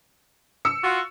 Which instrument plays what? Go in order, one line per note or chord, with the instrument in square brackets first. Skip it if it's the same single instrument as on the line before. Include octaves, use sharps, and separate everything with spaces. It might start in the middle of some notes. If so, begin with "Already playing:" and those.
[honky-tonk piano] E6 C#7
[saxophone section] F4 F#4